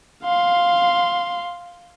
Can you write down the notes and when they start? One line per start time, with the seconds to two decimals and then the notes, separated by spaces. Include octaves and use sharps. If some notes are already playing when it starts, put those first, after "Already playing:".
0.24 F5 C6